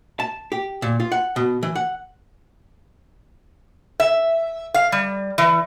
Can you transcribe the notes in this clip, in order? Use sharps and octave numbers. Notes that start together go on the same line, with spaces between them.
A5
G4
A#2
F4
F#5
B2
E3
F#5
E5
F5
G3
E3